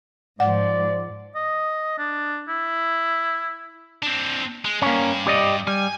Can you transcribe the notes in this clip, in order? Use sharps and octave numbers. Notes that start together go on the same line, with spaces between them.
G#2 F3 D5 F#5
D#5
D4
E4
C4 D4
G#3
G2 A#3 C#4
G4 D5 D#5
G3 G#5